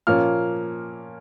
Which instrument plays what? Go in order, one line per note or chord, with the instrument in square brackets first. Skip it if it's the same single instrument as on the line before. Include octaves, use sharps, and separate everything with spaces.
[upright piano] A#2 F3 A#3 C#4 F6